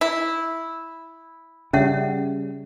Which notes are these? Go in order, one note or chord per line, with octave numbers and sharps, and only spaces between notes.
E4
C#3 G3 C#4 E5 F#5